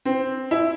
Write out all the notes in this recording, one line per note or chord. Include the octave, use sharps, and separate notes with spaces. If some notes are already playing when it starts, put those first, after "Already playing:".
C4
E4